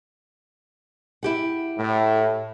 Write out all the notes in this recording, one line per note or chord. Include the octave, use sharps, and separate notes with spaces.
E4 G4 F#5
A2